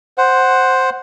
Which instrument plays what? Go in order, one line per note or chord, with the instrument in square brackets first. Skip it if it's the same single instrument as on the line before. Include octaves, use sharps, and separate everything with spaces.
[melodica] C5 F#5